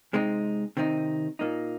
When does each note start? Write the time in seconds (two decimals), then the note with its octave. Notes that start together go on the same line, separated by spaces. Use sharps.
0.13 C3 G#3 C4 D#4
0.77 C3 D#3 C4 D#4
1.39 A#2 A#3 D#4